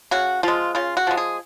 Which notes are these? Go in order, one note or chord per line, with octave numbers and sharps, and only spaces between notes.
C#3 F#4
F3 G#3 F4
C#3 F4
F#4
F3 G#3
G#4